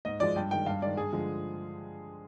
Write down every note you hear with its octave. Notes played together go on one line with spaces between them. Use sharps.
G#2 D#5
F3 G#3 D5
G2 G5
D#3 G#3 G5
G2 F5
D#3 G#3 D5
G2 G#4
D3 F3 G#3